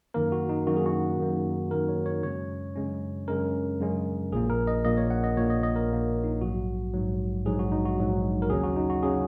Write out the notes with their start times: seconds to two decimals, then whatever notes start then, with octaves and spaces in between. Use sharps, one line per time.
0.14 F#2 D#3 A#3 A#4
0.32 F#4
0.49 D#4
0.67 F#2 D#3 A#3 F#4
0.76 G#4
0.86 F#4
1.19 F#2 D#3 A#3
1.71 F#2 D#3 A#3 A#4
1.89 C#5
2.06 C#5
2.23 F#2 C#3 G#3 C#4 C#5
2.76 F#2 C#3 G#3 C#4
3.28 F#2 C#3 G#3 C#4 A#4
3.80 F#2 C#3 G#3 C#4
4.32 A#1 A#2 A#3 G#4
4.50 A#4
4.67 D#5
4.85 A#1 A#2 A#3 D#5
4.97 C#5
5.10 F#5
5.24 D#5
5.37 A#1 A#2 A#3 C#5
5.50 D#5
5.63 D#5
5.76 A#4
5.89 A#1 A#2 A#3
6.24 D#4
6.41 A#1 G#2 F#3 F#4
6.93 A#1 G#2 F#3
7.45 A#1 G#2 F#3 G#4
7.59 F#4
7.72 D#4
7.85 F#4
7.98 A#1 G#2 F#3
8.42 A#4
8.50 D#2 C#3 F#3 C#4 G#4
8.64 F#4
8.76 D#4
8.90 F#4
9.03 C#3 F#3 C#4 G#4